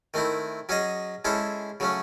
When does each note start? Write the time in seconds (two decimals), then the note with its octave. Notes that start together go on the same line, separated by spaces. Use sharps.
0.14 D#3 A3 C4 E4
0.69 F#3 C#4 G#4 D#5
1.25 G#3 C#4 E4 A4 C5
1.80 C#3 F#3 A3 C#4